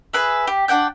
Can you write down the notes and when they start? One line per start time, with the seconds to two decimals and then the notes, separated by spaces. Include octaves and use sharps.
0.14 G#4 B4 E5
0.47 G4
0.68 D4 F#5 G5 G6